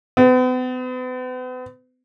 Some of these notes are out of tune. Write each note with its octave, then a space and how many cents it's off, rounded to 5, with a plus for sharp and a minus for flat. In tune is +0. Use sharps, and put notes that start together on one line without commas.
B3 +40